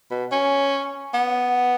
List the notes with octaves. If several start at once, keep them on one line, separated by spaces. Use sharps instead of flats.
B2
C#4
B3